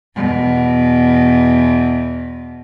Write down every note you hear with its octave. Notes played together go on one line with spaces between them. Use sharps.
E2 B2